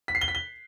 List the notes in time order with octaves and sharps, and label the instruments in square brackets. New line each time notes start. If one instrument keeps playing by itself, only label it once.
[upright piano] B6
C7
G7
B6
G7